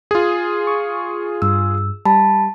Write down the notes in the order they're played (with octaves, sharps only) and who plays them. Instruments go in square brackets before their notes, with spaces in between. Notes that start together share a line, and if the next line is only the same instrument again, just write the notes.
[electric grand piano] F4 G#4
[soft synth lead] C#6
[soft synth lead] G2 [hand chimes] E6
[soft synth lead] G3 [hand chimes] A5 B5